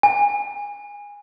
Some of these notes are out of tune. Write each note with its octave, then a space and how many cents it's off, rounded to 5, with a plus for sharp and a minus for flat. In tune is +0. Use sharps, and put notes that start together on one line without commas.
G#5 -20